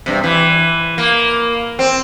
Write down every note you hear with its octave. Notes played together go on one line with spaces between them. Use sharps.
G2 C3
E3
A#3
C4